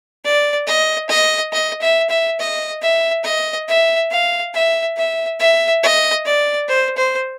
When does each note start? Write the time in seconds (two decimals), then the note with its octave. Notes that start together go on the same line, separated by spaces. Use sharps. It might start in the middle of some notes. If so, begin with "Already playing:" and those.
0.24 D5
0.67 D#5
1.10 D#5
1.52 D#5
1.81 E5
2.10 E5
2.39 D#5
2.82 E5
3.24 D#5
3.68 E5
4.11 F5
4.54 E5
4.97 E5
5.39 E5
5.83 D#5
6.26 D5
6.68 C5
6.97 C5